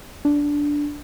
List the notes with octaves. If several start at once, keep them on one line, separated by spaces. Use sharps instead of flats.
D4